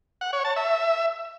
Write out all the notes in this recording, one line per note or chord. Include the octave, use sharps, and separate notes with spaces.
F#5
C#5
A5
E5